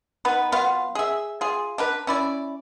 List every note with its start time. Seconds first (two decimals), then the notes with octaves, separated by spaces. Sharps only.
0.25 B3 D#4 B4
0.52 F#3 B3 F4 F5
0.95 G#4 E5
1.41 F4 G#4
1.78 D4 A#4 B4
2.07 C#4 E4 D5